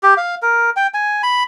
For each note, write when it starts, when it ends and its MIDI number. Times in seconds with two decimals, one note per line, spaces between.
0.03 0.14 67
0.17 0.35 77
0.42 0.70 70
0.76 0.87 79
0.94 1.22 80
1.23 1.43 83